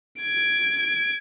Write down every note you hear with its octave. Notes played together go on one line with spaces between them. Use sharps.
G#6 D7